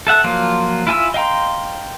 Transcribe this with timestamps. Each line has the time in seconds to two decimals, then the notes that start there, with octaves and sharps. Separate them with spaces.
0.07 A4 E5 F#5
0.24 F3 F#3 A#3 F4
0.87 E4 F4 G#5 A5 E6
1.14 D#5 F5 G5 A#5 C6